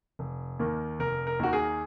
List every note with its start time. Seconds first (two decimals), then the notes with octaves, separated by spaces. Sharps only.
0.19 F1
0.59 D#2 D#3 A#3
1.00 F1 A#4
1.27 A#4
1.39 D#2 D#3 A#3 F#4
1.53 G#4